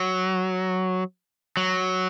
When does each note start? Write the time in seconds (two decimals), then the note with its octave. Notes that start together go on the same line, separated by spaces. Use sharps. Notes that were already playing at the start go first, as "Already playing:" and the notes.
Already playing: F#3
1.57 F#3